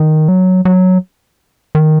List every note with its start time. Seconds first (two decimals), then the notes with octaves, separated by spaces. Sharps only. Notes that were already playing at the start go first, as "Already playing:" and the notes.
Already playing: D#3
0.28 F#3
0.65 F#3
1.75 D#3